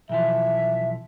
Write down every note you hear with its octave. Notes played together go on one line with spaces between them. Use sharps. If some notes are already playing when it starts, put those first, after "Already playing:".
B1 E3 F3 E5